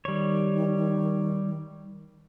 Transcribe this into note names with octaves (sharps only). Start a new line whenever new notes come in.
D#3 G3 C#5